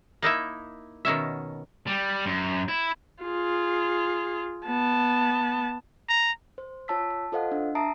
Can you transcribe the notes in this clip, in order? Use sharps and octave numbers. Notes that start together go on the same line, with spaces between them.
A#3 D#4 E4 E5
B2 D#3 C#4 E5
G3
F#2
E4
F4 G#4
B3 A5
A#5
C5
F4 C#5 A5 E6 B6
A5
F4 A4 C5 D#5 F5 F#5
D4
E5 A5 A#5 D#6 C7 D7